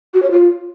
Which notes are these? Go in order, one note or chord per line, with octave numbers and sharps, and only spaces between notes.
F#4
C#5
F4